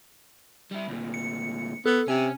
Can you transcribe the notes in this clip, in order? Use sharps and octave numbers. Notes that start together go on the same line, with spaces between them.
G3 E4
D2 A#2
C#7
B3 A4
C3 C#4 G#5